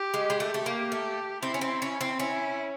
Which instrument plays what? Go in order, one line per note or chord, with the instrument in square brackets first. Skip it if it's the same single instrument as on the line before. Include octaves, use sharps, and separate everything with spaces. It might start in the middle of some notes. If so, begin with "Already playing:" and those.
Already playing: [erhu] G4
[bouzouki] G#3
G#3
A3
A3
[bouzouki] A#3 [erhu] G4
[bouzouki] A3
[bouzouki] C4 [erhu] E4
[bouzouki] C#4
C4
C#4
C4
[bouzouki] C#4 [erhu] E4